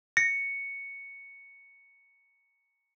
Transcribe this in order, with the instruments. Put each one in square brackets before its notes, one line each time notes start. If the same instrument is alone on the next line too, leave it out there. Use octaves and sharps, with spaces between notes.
[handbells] A#6 [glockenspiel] C#7